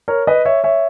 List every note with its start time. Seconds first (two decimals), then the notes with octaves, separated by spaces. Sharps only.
0.08 A#4 C#5
0.27 B4 D#5
0.45 C#5 E5
0.64 C#5 E5